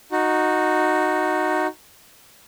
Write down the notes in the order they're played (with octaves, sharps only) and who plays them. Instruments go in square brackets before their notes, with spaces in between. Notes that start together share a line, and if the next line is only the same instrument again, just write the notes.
[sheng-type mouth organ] D#4 F#4